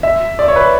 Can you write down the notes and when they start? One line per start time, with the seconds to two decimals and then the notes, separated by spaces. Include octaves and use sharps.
0.03 E5
0.39 D5
0.48 C#5
0.56 B4